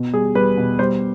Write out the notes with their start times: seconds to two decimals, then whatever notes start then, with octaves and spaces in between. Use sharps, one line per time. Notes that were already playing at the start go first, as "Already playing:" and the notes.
Already playing: B2
0.13 G3 G#4
0.35 G3 B4
0.57 B2
0.79 G3 C5